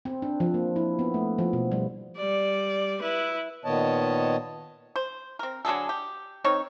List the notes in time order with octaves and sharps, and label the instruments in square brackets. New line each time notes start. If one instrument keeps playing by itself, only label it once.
[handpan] C4
D4
F3
A#3
E4
B3
A3
F3
B2
G3
[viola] G3 D5
E4 B4
[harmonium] A#2 D#3 B3 C#5 D#5 A5
[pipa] C5
C4 A#4
D3 F#3 G#4 A4
G4
D#3 C4 D#4 C#5